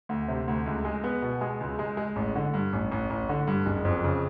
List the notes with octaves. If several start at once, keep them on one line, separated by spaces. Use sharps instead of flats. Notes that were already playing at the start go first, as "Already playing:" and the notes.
D2
C3
D2
C#2
G#3
B3
B2
G#3
C#2
G#3
G#3
A1
D3
G2
A1
A1
A1
D3
G2
F#1
F2
C#3